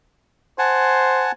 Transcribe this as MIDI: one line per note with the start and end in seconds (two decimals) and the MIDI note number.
0.59 1.30 72
0.59 1.32 78
0.59 1.32 80
0.59 1.32 81